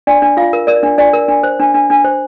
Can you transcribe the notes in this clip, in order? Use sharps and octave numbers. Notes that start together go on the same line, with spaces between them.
D4 D5
D4
F4 F5
A#4
A#4 D5
D4
D4 D5
A#4
D4
C5
D4
D4
D4
C5